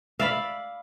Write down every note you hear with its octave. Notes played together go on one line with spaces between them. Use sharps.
D5 E5 F5 B5